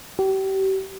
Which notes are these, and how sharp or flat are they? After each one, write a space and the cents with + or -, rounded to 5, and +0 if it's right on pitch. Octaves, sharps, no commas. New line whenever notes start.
G4 -35